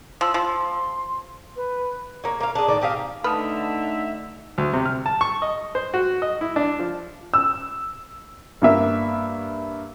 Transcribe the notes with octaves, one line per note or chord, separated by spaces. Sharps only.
F3 E6
F3 C6
B4
A#3 C#5
A#3 F5
D4 G#4
A2 D#3 D5
C4 G4 G#4 F5
D3 A3 D#4 B4 E5 A5 D#6 F6
D2
C3
F6
A5
C#6
D#5
C5
F#4
D#5
E4
D4
F3
E6
G2 A#3 E5